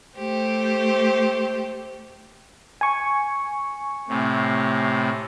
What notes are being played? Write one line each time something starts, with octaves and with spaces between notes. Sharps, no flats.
A3 G4 C5
G#5 C#6
A2 C3